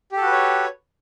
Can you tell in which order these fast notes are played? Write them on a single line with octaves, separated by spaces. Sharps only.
G4 A4 F#4 B4 C#5